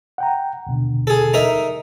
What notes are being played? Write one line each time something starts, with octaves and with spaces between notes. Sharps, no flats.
F#5 G5 A#5
D#2 B2 D3
G#4 A4
D#4 A#4 E5